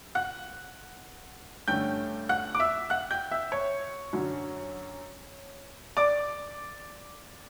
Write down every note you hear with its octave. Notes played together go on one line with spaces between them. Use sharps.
F#5 F#6
G2 D3 A3 C#4 G5 G6
F#5 F#6
D6
E5 E6
F#5 F#6
G5 G6
E5 E6
C#5 C#6
F#2 D3 F#3 C#4
D5 D6